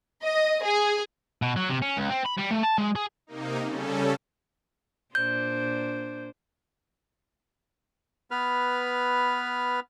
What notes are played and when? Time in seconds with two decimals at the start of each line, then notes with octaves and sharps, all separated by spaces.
0.24 D#5
0.64 G#4
1.42 B2
1.56 F#3
1.69 C3
1.82 C#4
1.97 C#2
2.10 C4
2.26 B5
2.38 G3
2.51 A3
2.63 A5
2.78 G#3
2.96 G#4
3.27 C3 A#3 D#4
3.65 C#3 G3 C#4 A4
5.15 A#2 D4 C5 G6
8.31 B3 B4 F6